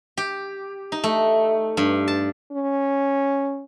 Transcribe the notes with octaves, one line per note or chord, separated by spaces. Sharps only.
G4
D#4
A3
G2
A5
C#4